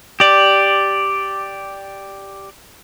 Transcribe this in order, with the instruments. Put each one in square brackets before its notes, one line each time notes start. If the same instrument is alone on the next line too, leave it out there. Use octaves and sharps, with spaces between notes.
[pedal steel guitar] G4 D5